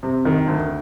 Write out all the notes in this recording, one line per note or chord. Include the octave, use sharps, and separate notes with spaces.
C3
D#3
D2